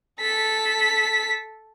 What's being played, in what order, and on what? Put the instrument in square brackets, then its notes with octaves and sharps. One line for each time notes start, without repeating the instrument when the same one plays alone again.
[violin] A4 B6